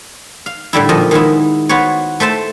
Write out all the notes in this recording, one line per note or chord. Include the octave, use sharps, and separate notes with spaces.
F5
A2 D3 G3 E4
A#2 F3 D#5
D#3 G#3 B3 E4
B3 F#4 C5 C#5
A3 C5 E5 A5